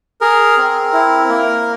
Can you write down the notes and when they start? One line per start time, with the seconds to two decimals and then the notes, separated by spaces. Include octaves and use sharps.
0.21 G#4 A#4
0.58 C4
0.93 E4
1.29 A#3